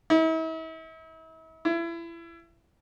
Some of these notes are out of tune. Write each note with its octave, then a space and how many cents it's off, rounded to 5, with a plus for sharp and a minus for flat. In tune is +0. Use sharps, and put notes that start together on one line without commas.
E4 -40
E4 +30